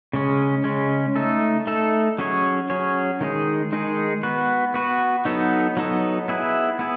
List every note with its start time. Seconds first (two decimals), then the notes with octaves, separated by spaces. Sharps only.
0.13 C#3 G#3 C#4
0.64 C#3 G#3 C#4
1.16 A3 D#4 A4
1.67 A3 D#4 A4
2.18 F#3 C#4 G#4 C#5
2.70 F#3 C#4 G#4 C#5
3.21 D#3 G#3 D#4 G#4
3.72 D#3 G#3 D#4 G#4
4.23 B3 F#4 B4
4.74 B3 F#4 B4
5.25 F#3 B3 D#4 A4
5.77 F#3 B3 D#4 A4
6.28 B3 E4 G#4 B4
6.79 B3 E4 G#4